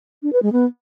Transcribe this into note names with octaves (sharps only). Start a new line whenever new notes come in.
D4
B4
G#3
B3